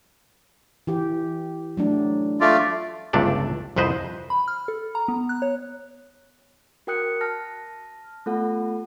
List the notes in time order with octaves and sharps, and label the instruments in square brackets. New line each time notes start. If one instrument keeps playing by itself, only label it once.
[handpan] E3 G4
F#3 A3 D4
[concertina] A3 F4 D5
[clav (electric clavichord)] G1 C#2 G2 A3 D4 D5
C2 F2 B4 C5 D#5
[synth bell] B5
F6
A4
A#5
B3
F#6
C#5
[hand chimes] F#4 A#4 G5 D#6 F#6 C#7
A5 F6 A#6
A3 B3 F4 A4 F#5